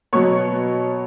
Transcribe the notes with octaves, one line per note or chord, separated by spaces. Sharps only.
B2 F#3 B3 C#5 C#6